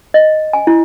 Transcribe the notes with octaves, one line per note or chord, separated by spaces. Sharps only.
D#5
G#5
E4